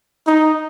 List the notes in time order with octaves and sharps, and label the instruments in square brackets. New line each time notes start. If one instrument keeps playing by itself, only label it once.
[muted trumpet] D#4